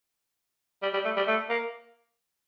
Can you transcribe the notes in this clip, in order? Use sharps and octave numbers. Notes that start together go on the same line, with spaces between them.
G3
G3
A3
G3
A3
A#3